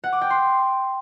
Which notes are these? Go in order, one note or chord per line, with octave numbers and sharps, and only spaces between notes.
F#5
D6
G5
C6